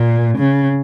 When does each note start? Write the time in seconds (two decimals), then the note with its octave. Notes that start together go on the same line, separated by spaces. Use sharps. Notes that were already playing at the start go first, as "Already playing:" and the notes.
Already playing: A#2
0.38 C#3